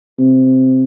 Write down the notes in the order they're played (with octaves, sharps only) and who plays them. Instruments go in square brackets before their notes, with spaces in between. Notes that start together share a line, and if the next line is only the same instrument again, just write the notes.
[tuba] C3